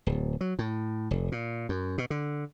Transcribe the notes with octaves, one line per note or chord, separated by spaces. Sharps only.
D1
F#3
A2
F1
A#2
F#2
B2
D3